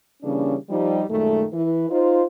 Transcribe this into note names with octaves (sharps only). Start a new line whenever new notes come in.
C#3 E3 G3 A#3 C#4 D4
F3 G3 D#4
F#2 A#2 D#3 G#3 A3
E3 E4 B4
D#4 F4 C5